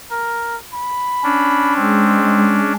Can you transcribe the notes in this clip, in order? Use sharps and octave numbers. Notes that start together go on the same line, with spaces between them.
A#4
B5
C#4 D4
G#3 C4